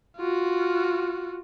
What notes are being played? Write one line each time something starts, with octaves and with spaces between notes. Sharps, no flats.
F4 F#4